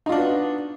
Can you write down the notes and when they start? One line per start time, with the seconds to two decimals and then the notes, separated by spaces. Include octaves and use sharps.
0.06 D#4
0.09 F4
0.12 D4
0.15 F#4
0.18 B3